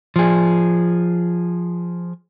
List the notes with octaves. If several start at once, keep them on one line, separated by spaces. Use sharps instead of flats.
F3 G#4